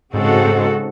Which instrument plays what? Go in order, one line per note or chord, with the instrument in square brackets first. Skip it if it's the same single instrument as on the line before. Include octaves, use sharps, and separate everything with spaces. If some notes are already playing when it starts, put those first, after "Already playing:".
[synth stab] G#2 [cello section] C#3 G#3 C4 F#4 A4
[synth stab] G#2
G#2
G#2
G#2